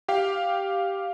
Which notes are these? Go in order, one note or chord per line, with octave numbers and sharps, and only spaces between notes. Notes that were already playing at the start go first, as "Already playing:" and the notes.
G4 F5 G5